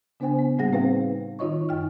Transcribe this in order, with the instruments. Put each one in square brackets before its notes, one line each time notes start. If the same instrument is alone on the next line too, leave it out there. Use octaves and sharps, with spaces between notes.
[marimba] C#3 B3 D4 C5 G5 G#5
B3
A2 G3 A#3 G#4 F#5 A#6
C4 D#4 B4 C5 F5 G5
D#3 D#4 F4 C#5 D#5 C#6
F#2 G5 F6